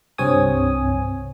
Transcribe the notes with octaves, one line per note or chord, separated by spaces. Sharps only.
C2 G2 C4 C#5 G#5 D#6